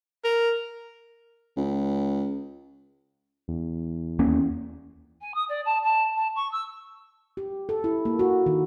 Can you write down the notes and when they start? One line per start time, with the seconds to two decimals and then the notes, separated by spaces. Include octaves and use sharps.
0.24 A#4
1.57 C#2
3.48 E2
4.19 D#2 A#3 C#4
5.21 G#5
5.35 D#6
5.49 D5
5.65 A5
5.84 A5
6.16 A5
6.36 C#6
6.52 E6
7.37 G4
7.69 A4
7.84 E4
8.05 A#3
8.19 F#4
8.46 D#3